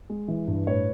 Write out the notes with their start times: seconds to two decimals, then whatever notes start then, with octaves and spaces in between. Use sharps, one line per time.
0.10 G#3
0.28 E3
0.47 G2
0.67 A2 B4 C#5